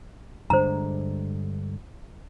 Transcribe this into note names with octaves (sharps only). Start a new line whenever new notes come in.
G2 D3 G#3 C5 A#5